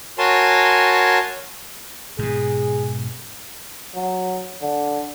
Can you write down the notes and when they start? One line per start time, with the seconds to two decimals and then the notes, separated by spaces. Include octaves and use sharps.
0.18 F#4 A#4 C#5 G#5 A5 C6
2.19 G#2 B2 G#4
3.95 F#3
4.62 D3